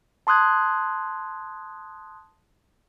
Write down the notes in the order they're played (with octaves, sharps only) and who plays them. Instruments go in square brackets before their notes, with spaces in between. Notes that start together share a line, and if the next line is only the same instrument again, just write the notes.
[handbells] A5 C6 D#6 F#6 G#6